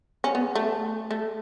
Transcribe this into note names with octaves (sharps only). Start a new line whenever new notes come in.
C#4
B3
A3
A3